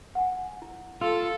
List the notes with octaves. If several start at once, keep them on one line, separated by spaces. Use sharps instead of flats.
F#5 G#5
E4
F4 A4 E6